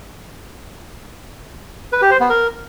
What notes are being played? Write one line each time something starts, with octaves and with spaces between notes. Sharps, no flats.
B4
G4
C5
B3
A#4